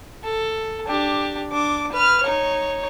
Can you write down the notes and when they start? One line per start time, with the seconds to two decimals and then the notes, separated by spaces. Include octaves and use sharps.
0.24 A4
0.87 D4 G4
1.52 D4 D6
1.93 B4 F6
2.23 D#4 C#5